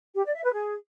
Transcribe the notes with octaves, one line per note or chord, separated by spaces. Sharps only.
G4
D5
E5
B4
G#4